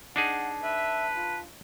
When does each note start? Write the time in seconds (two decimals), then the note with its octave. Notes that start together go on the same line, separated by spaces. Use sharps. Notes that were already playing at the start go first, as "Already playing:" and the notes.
0.16 D4 D#4 G#4 F#5 A5
0.63 B4 E5
1.16 F4